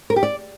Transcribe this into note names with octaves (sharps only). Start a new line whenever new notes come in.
A#4
G4
D5